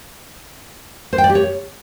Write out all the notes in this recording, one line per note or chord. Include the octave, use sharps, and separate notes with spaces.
C5
G5
D5
G4
C#5